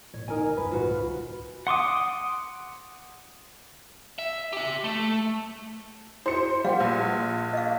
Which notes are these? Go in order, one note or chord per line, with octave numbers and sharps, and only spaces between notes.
A2 C#5
C#2 D3 D#4 A#4 G#5
G2 B4
A2 C3 F4 F#4 B4
C#2 D3
F#5 C6 D6 D#6
E5
G4 E5
A3
E4 F#4 C5 C#7
G3 F5 F#5
A#1 B4
D#5 F5